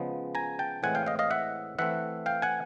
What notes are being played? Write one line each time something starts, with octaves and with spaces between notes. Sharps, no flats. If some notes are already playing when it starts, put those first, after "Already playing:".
Already playing: C#3 F3 G#3 B3
G#5 A#5
G5 A5
A2 E3 G#3 C4 F#5 G#5
F5 G5
D#5 F5
D#5 F5
E5 F#5
E3 A3 C4 E5 F#5
F5 G5
F#5 G#5